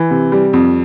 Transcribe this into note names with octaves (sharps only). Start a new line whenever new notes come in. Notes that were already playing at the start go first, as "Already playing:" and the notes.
Already playing: E3
C3
G3
F2